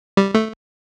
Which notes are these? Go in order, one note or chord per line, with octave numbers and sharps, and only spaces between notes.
G3
A3